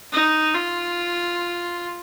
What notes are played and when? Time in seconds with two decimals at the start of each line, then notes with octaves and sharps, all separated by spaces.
0.13 D#4
0.54 F4